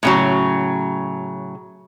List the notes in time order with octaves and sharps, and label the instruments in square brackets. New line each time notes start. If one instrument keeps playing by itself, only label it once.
[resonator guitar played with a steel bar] A2 C#3 F#3